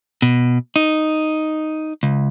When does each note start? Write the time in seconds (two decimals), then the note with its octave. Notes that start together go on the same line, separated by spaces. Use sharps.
0.22 B2
0.76 D#4
2.03 C#2